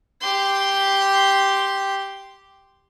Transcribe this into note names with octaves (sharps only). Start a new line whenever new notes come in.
G4 C6